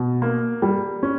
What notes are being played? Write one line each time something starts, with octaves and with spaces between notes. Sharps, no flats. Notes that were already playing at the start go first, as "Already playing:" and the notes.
Already playing: B2
A#3
G3
C#4